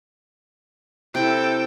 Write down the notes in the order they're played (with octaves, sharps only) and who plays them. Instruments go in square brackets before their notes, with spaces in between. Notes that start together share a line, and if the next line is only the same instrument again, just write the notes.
[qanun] C3 E4 [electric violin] A4 G5